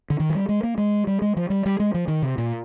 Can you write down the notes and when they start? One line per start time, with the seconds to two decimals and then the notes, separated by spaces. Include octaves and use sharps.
0.10 D3
0.20 D#3
0.30 F3
0.35 G3
0.49 G#3
0.63 A#3
0.78 G#3
1.07 G3
1.22 G#3
1.37 F3
1.50 G3
1.66 G3
1.80 G#3
1.94 F3
2.08 D#3
2.22 C3
2.38 A#2